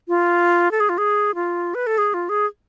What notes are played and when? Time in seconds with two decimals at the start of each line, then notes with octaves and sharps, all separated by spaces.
0.08 F4
0.71 A4
0.80 G#4
0.89 F4
0.98 G#4
1.35 F4
1.75 B4
1.87 A4
1.98 G#4
2.14 F4
2.29 G#4